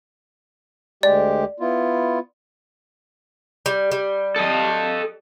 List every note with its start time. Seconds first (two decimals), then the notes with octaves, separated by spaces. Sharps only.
1.03 D2 G#3 G4 D5
1.60 B3 E4 F4
3.66 G3
3.92 G3
4.36 A4 D#5